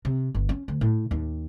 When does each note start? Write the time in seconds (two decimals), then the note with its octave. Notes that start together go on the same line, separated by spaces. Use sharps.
0.05 C3
0.35 G1
0.49 C#4
0.68 D2
0.81 A2
1.11 D#2